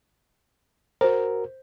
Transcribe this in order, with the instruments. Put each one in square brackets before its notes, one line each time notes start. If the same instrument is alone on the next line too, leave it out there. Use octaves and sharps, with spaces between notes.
[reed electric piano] F#4 A#4 [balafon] C5